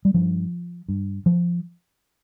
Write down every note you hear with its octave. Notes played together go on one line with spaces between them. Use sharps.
G3
G2 F3
G2
F3